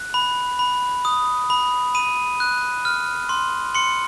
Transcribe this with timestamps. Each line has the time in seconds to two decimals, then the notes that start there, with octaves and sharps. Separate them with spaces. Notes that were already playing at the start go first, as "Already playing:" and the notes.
Already playing: F#6
0.14 B5
0.59 B5
1.05 D#6
1.50 B5
1.95 B5 D#7
2.40 F#6
2.85 F6
3.29 C6
3.75 C6 C#7